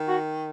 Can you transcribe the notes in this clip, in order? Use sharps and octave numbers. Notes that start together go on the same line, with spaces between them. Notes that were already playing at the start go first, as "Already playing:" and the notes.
Already playing: D#3
F#4